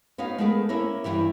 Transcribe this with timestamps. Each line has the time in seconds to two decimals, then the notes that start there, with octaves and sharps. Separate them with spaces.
0.18 B3 C#4 D#4 F#4 F5
0.38 G#3 A3 B3 G#4 A#4 B4
0.69 A#3 C#4 E4 A#4
1.04 G2 E3 E4 G4